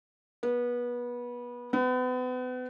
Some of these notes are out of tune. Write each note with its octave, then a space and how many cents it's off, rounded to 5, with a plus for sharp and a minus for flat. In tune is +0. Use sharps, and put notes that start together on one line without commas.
B3 -25
B3 +35